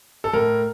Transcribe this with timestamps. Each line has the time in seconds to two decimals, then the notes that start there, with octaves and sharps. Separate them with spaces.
0.24 A4
0.33 A2 A#4